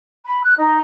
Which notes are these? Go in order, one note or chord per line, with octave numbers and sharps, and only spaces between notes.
B5
F#6
D#4